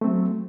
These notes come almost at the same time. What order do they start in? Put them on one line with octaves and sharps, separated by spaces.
A3 C4 F#3